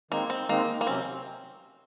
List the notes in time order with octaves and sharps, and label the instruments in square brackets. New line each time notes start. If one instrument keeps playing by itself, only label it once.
[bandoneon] D#3 G#3 C4 D#4 [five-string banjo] A#3
[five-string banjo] C4
[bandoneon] D#3 G#3 C4 D#4 [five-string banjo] A#3
[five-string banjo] A#3
[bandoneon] C3 F#3 C#4 [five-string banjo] C4